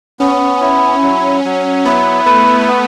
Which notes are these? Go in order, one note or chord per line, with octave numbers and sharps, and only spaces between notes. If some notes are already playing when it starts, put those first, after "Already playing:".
B3 C#4
E4
F#3
F#3
B3 E4
A3 B4
B3